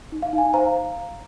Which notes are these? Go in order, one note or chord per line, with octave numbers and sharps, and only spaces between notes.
D#4
F5
D#4
G#5
C5 F5 A#5